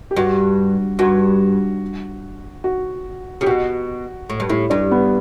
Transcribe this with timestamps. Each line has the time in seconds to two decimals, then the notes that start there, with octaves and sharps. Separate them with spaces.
0.11 G4
0.17 G2 F#4
0.99 G2 F#4
2.64 F#4
3.41 C#3 G4
3.46 B2 F#4
4.30 A2
4.40 G2
4.49 A2 E4
4.70 G2 D4
4.91 B3